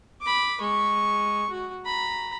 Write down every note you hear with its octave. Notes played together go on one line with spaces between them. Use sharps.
B5 D6
G#3 C#6
F#4
A#5 B5